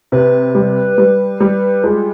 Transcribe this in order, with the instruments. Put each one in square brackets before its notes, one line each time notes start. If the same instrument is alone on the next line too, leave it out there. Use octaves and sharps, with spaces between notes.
[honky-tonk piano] C3 [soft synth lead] B4
[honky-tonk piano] G3
G3
G3
[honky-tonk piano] G#3 [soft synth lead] F4